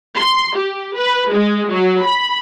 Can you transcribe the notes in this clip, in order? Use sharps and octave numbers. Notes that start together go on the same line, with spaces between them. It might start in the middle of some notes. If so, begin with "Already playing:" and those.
C6
G4
B4
G#3
F#3
B5